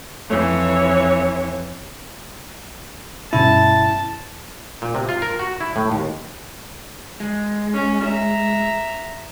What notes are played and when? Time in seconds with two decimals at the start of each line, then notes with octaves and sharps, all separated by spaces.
0.27 F2 E3 C#5
3.33 G2 B2 C#4 E4 A5
4.82 A#2
4.95 C3
5.09 F4
5.22 A#4
5.39 F#4
5.60 E4
5.76 A2
5.92 D#2
7.20 G#3
7.73 C#4
8.04 E5 A#5